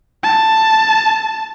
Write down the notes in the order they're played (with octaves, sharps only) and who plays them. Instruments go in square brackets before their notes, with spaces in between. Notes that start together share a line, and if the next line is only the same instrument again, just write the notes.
[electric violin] A5